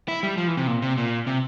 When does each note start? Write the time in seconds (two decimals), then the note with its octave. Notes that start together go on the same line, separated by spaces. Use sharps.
0.08 E4
0.23 G3
0.37 F3
0.48 E3
0.57 C3
0.67 A#2
0.82 C3
0.98 A#2
1.27 C3